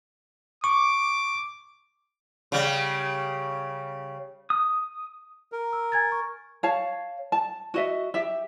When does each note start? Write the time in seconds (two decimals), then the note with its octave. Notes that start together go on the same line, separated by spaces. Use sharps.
0.64 C#6 D6
2.52 C#3 G3
4.50 D#6
5.52 A#4
5.73 E6
5.92 G#5 G#6 A6
6.12 C#6
6.63 C#5 F5 A5
7.32 A5
7.74 F#4 D#5 E5
8.14 G4 E5